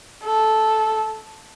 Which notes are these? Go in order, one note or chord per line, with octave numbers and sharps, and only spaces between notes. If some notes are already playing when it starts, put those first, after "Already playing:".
A4